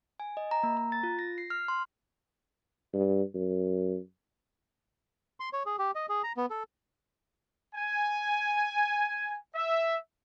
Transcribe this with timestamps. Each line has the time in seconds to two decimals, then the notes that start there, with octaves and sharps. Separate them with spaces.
0.20 G#5
0.37 D#5
0.51 A#5
0.63 A#3
0.77 A#5
0.92 A6
1.03 F4
1.19 A#6
1.38 C7
1.50 F6
1.68 C6
2.94 G2
3.34 F#2
5.40 C6
5.53 C#5
5.66 G#4
5.79 G4
5.95 D#5
6.09 G#4
6.23 A#5
6.37 B3
6.50 A4
7.75 G#5
9.55 E5